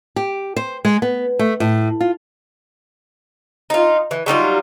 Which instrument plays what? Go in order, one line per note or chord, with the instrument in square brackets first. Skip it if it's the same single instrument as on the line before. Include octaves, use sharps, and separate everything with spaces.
[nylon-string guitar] G4
C5
G#3
B3
A3
A2
F4
[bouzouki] D#4 F4
E3
F#3 G3 D#4 F4